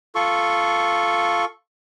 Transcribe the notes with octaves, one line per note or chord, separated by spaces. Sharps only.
F4 A4 C#6